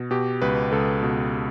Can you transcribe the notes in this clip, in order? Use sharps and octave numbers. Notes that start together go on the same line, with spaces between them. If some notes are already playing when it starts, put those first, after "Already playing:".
Already playing: B2
B2 G4
C#2 B4
C#2 A4
B2